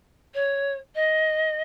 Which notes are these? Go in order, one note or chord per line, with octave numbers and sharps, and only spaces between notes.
C#5
D#5